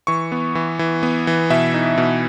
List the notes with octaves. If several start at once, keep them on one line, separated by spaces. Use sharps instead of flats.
E3 C#6
B3
E3
E3
B3
E3
B2 E5
D#4
B2